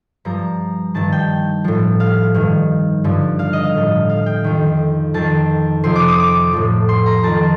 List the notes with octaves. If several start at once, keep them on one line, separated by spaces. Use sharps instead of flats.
G2 F3 A#5
G2 D#3 A5
G5
A2 F3
F5
G2 D#3
G2 D3 F3
F5
D#5
F5
A2 F3
F5
G5
F2 D#3
F2 D#3 A5
F2 C3 F3 C6
D6
D#6
D6
A2 F3
C6
A#5
F2 D#3 A5